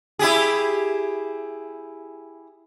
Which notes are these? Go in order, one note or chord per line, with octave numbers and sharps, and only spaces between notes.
E4 G4 G#4